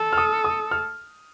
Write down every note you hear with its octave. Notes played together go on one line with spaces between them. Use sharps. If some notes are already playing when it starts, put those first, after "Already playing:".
Already playing: A4
F6
D#6
D#6
F6